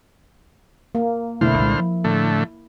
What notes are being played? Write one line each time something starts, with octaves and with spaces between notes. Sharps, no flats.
A#3
F1 B2 D3 A3 E4 C5 F6
C2 A#2 G#3
F3
A2 D3 A3